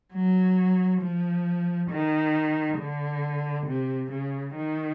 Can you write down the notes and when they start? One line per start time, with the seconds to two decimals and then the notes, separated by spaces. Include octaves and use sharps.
0.13 F#3
1.02 F3
1.90 D#3
2.79 D3
3.67 C3
4.12 C#3
4.56 D#3